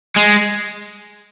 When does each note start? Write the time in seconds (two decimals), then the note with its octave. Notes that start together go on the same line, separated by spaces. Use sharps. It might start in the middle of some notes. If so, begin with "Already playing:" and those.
0.17 G#3